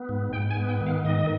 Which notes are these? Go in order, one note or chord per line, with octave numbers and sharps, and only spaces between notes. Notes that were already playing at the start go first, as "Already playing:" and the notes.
Already playing: B3
G#2
G#2 G5
G#5
B3
G5
D#3
F5
G#2 D#5